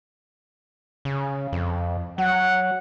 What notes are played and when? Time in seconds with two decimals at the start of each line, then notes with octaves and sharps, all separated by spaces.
1.05 C#3
1.52 F2
2.18 F#3 F#5